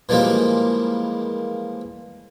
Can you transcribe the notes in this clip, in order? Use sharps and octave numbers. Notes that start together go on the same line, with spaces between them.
E3 F3 G3 G#3 A#3